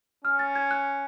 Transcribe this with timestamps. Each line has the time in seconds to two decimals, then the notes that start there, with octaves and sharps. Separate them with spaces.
0.24 C#4 F6
0.39 A6
0.55 G#6
0.71 F#6